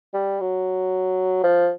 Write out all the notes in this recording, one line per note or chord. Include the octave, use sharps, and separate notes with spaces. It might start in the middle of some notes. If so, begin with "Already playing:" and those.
G3
F#3
F3